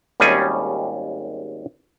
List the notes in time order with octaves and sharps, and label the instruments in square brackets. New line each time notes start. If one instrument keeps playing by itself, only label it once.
[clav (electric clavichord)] G#1 D#2 G3 C#4 G#4 G#5